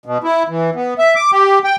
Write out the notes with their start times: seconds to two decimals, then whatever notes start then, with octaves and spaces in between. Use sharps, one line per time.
0.06 B2
0.24 E4
0.48 E3
0.75 B3
0.99 E5
1.16 D6
1.32 G4
1.64 G5